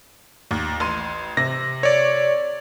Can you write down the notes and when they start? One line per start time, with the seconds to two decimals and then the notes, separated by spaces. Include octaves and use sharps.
0.51 D#2
0.80 A1 C6 D#7
1.37 C3 A#6
1.83 C#5 D5